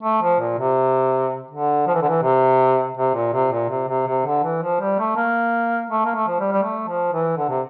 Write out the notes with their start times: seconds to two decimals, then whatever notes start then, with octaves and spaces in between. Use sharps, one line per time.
0.03 A3
0.22 F3
0.40 A#2
0.58 C3
1.50 D3
1.87 F3
1.94 E3
2.02 D3
2.09 E3
2.23 C3
2.97 C3
3.15 A#2
3.33 C3
3.51 A#2
3.70 C3
3.88 C3
4.07 C3
4.26 D3
4.43 E3
4.62 F3
4.81 G3
4.99 A3
5.16 A#3
5.90 A3
6.05 A#3
6.15 A3
6.28 F3
6.40 G3
6.52 G3
6.63 A3
6.87 F3
7.13 E3
7.37 D3
7.49 C3